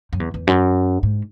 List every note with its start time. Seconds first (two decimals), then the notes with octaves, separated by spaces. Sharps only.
0.13 F#2
0.20 E2
0.34 E2
0.47 F#2
1.03 G#2